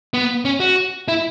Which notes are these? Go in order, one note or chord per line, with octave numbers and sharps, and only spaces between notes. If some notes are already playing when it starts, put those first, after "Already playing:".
B3
C#4
F#4
E4